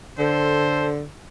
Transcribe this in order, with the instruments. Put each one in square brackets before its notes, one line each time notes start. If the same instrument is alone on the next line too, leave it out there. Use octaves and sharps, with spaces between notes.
[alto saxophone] D3 [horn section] A4 C5